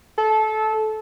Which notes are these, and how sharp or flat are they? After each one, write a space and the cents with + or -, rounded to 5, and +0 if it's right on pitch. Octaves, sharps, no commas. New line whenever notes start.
A4 -20